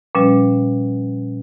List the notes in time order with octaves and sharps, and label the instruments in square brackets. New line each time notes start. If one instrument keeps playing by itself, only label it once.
[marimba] A#2 F3 G3 C#4 B4